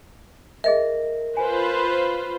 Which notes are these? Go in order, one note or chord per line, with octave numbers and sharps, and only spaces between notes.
G#4 A#4 D#5 E5
F4 B4 C5 G#5